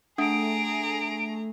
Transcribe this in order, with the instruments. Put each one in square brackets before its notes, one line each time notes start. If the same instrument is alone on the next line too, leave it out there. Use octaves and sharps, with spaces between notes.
[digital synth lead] A3 [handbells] D4 F#5 D#6 [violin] G#4 A#5 [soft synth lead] D7